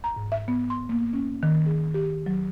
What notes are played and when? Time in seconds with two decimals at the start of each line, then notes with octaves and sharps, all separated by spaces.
0.04 A#5
0.16 G#2
0.32 E5
0.48 B3
0.70 C6
0.89 A#3
1.13 C#4
1.43 D#3
1.66 G#4
1.94 G4
2.26 F#3